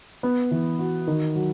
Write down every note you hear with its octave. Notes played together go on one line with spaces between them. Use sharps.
B3
E3
F#4
D#3
F#3